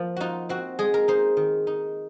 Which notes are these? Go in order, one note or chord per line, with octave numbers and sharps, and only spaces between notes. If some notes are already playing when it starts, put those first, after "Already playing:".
Already playing: F3 A#3 C5
D#4 F4 F#4
C4 F#4
G#3 G#4
A#4
D#4 C5
D#3
D#4